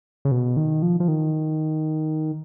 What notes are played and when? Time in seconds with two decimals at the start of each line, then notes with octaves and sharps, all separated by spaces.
0.25 C#3
0.32 B2
0.57 D#3
0.82 F3
1.00 F3
1.08 D#3